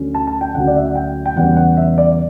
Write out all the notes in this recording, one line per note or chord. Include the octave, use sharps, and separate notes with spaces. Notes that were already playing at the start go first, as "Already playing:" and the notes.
Already playing: D2 D3 F#3 C#4
A5
A5
G5
D2 D3 F#3 C#4 F#5
D5
E5
F#5
G5
G5
E2 C#3 G3 B3 F#5
F#5
E5
D5